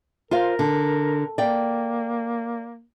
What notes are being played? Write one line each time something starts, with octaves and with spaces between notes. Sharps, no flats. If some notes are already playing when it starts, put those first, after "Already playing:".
F4 A#4 C5 F5
D3
A#3 D5 G5